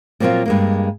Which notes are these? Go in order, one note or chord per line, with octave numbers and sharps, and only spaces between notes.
A#2 F3 F#3 A#3 C4 F4
G2 G#3 A#3